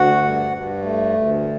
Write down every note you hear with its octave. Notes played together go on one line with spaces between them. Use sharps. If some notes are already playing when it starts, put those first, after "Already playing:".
Already playing: D2 F#4 F#5
G2
G2
A3
D2